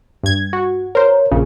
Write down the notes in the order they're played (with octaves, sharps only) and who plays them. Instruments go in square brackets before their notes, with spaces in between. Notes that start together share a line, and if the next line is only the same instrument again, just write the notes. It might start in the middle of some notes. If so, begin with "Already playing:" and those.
[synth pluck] G2 G#6
F#4
[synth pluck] A#4 C5 [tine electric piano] C#5
[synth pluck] A#1 A#2 C#3